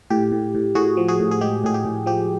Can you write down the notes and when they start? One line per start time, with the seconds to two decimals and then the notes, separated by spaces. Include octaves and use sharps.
0.10 A2 G4
0.32 A2
0.55 A2
0.75 A2 F#4 G#4
0.97 F3
1.08 F#4 G#4
1.20 A2
1.31 G#4
1.41 G#3 G4
1.64 A2 G#4
1.74 G4
1.85 A2
2.06 F3 G4